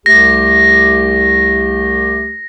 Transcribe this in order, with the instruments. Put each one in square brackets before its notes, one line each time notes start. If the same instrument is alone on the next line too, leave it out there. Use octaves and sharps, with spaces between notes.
[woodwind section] C2 A3 G4 [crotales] A#6